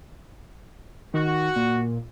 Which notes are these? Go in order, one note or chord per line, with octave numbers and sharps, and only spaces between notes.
D#3 F#4
A#2